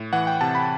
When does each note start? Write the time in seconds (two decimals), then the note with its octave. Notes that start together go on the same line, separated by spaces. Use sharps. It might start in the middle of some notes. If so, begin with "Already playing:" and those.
Already playing: A2
0.13 E3 F#5
0.27 G5
0.41 C3 A5
0.55 B5